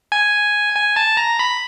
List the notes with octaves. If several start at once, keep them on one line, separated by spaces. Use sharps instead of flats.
G#5
G#5
A5
A#5
B5